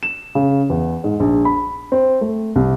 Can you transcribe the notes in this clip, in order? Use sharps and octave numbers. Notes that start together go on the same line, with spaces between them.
E7
C#3
E2
G#2
A#1
B5
C4
A3
C2